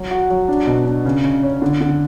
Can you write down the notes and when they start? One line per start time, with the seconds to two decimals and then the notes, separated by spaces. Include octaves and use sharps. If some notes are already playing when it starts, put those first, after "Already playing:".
Already playing: F#3
0.11 F#4
0.30 F#3
0.48 D4
0.67 B2
0.86 D4
1.05 C#3
1.24 C#3
1.43 C#4
1.62 D3
1.81 D3